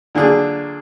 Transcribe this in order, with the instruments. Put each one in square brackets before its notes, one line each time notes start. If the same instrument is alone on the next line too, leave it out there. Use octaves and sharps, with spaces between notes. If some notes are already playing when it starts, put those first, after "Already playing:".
[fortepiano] A#2 D3 F#3 D4 G#4